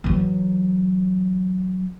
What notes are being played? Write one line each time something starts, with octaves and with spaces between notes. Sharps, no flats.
E3 F#3